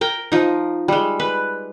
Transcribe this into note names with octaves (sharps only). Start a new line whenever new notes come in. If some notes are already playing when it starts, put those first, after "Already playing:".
A#4 G5 A#5
F3 D#4
G3 G#3
B4